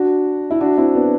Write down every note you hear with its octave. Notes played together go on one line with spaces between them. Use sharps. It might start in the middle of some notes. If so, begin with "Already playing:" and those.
Already playing: D4 F#4
E4
D4 F#4
C4 E4
B3 D4